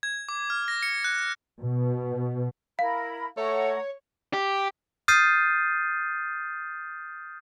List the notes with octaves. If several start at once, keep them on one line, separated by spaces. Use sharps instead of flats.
G#6
D6
F6
A#6
C#7
F#6
B2
E4 A#4 F5 B5
A3 C#5 F#5 A#5
G4
D#6 F6 G6 A6 C7 D#7